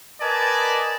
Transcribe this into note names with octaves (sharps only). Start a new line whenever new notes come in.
A#4 B4 D5 D#5 G#5 A5